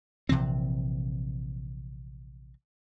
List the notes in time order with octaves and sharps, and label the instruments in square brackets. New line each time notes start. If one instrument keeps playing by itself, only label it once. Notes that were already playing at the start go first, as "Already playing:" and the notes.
[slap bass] A#1 C3 E3 C4